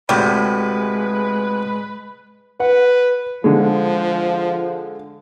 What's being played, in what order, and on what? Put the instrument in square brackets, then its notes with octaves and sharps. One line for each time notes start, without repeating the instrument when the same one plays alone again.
[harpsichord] D2 A2 C3 [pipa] G3 [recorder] G#3 [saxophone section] B4
[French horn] B4 [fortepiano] F#5
[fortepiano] D3 G#3 [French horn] F3